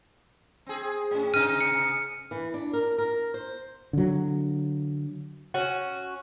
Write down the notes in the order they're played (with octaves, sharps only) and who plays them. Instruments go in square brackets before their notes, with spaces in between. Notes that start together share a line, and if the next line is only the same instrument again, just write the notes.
[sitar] C4 G#4
A2 C#4
[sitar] G#2 C3 D#4 [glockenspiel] F6 D#7
[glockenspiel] C#7
[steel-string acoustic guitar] E3
D4
A#4
A#4
C5
[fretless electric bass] D3 F#3
[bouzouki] C#4 F#4